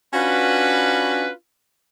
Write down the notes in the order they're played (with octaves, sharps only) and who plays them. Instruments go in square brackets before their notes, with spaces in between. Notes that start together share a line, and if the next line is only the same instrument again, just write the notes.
[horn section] C#4 D4 F4 F#4 B4